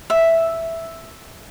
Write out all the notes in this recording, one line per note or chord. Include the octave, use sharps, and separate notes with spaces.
E5